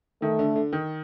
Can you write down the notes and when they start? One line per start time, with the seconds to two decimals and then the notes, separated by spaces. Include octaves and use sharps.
0.22 D#3 A3
0.39 D3
0.56 D3
0.73 D#3